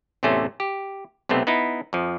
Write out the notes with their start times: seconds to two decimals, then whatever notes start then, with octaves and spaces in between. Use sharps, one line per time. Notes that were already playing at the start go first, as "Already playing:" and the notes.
0.23 A1 E2 C3 A3 C#4 C5
0.60 G4
1.29 B1 C3 A3 B3 C4
1.47 B3 D#4 E4
1.93 F2 F3